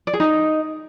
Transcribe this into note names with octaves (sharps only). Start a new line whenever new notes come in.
D5
G#4
D#4